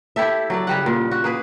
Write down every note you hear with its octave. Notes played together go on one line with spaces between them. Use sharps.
E4 G4 A4 E5
F#3 A4 D5
C#3 G3 F#5
A#2
F#4
A#3 G#4 B4